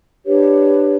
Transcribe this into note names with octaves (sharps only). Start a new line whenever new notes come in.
D4 G4 B4 C#5